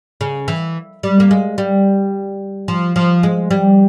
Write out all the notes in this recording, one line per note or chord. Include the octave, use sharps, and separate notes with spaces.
C#3
E3
G3
A#3
G#3
G3
F3
F3
G#3
G3